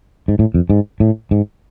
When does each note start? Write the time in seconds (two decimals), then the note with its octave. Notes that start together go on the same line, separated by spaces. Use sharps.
0.28 G#2
0.39 A2
0.54 F2
0.70 G#2
1.00 A2
1.31 G#2